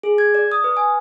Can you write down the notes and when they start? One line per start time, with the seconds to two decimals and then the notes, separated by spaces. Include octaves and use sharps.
0.03 G#4
0.18 G#6
0.35 D5
0.52 D#6
0.64 B4
0.77 G#5